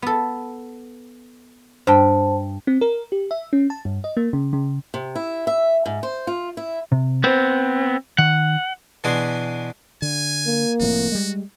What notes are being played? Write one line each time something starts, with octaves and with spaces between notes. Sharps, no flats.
B3 A4
G2 C5 G5 A5
C4
A#4
G4
E5
C#4
A5
G2
D#5
A#3
C#3
C#3
C3
E4
E5
G#2
C5
F4
E4
C3
B3 C4 B4 C5
D#3 F#5
B2 E3 D4 G#4 C6
D3 G#5
A#3
F1 F2 A2 F#4
G3 G#3